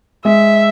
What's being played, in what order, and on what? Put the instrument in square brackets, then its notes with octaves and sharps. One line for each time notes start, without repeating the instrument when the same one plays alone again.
[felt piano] G#3 [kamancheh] E5